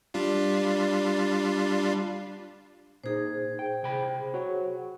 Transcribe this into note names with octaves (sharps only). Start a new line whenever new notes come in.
G3 D4 F4
A#2 D#4 G#4 C5
G5
C3 G5 B5
F#4 C#5 F#5